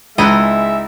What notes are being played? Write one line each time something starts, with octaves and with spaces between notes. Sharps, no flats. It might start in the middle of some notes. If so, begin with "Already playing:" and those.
C#2 G#3 D#4 E4 D#5 E5 A5 F#6